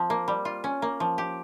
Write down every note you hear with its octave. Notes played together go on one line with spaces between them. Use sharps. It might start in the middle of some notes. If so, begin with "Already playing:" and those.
Already playing: F3 C4
A#3
G3
F4
C#4
A#3
F3
G4